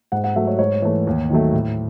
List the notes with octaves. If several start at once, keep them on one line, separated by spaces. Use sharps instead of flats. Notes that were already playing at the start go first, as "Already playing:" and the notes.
G#2 F#5
F#5
F#3 A3 E5
C#5
G#2 C#5
E3 A3
D#2
D#3 F#3 A3
A2